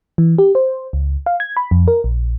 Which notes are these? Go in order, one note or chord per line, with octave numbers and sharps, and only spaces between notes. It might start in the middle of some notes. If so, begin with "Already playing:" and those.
E3
G4
C5
C#2
F5
G#6
B5
F2
A#4
A#1